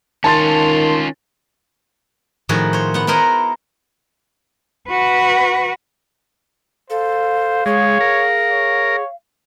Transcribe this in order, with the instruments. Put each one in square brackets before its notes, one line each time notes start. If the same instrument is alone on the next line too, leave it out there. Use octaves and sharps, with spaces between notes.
[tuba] D#3 [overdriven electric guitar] C#4 F4 [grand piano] A5 C6 A6
[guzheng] A2 D#3 F3 F#4 G#4
C5 C#5
B3 F#5
B3 E4 A#4 C5 D#5 F#5
[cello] F#4 B4
[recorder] A4 [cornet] C5 [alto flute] F5
[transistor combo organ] G#3 [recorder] G#4 [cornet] C#5
[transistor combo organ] A#4
[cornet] C#5